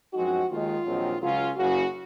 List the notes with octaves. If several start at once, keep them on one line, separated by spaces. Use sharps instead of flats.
F#2 F3 G#3 C4 D#4 F#4
D#2 D#3 G#3 F4
A#1 G#2 D#3 F#3 C4
C#2 C#3 F#3 C#4 F4
F#1 F#2 C#3 F#4